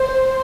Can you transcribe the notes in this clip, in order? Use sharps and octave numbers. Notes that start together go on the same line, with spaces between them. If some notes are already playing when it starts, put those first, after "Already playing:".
Already playing: C5